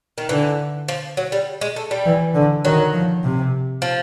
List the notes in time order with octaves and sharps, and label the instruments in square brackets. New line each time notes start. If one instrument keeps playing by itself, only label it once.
[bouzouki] D#3
[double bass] D3 [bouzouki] E3
[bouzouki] F3
F#3
G3
G#3
A3
G3
[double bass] E3
D3
[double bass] D#3 [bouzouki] F#3
[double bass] F3
C3
[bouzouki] F3